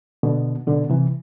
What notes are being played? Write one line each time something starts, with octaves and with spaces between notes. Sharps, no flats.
B2 D3
B2 D3
C3 E3